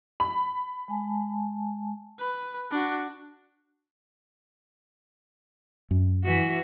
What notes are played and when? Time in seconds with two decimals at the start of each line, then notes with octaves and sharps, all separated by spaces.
0.20 B5
0.88 G#3 G#5 A5
2.20 B4
2.72 D4 F#4
5.91 F#2
6.24 E3 F#4